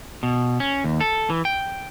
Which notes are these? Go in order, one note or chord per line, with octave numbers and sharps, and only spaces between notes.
B2
C#4
D#2
A4
E3
G5